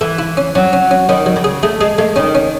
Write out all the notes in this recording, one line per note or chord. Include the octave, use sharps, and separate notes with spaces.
E3 A4
E4
C#4
F#3 C#4
C#4
C#4
D#3 C#4
F#3
C#3
G#4
A3 G#4
G#3 G#4
G#3 A3
D#3 C#4
C#4